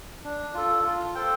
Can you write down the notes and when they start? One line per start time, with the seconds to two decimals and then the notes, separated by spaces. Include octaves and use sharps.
0.24 D4
0.54 F4 A4
0.84 F4
1.15 A4 C5 G5